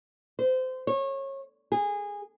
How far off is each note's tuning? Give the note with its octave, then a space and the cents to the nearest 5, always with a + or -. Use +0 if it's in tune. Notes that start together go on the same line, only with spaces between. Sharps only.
C5 -25
C#5 -25
G#4 -20